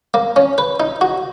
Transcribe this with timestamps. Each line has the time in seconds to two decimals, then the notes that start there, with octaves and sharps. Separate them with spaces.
0.14 A#3
0.36 C#4
0.58 B4
0.80 D#4
1.01 F#4